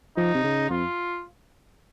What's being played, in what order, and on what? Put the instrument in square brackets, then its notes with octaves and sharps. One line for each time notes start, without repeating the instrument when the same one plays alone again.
[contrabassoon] F3 [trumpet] D#4
[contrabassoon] C3
C#3
[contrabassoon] F2 [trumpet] F4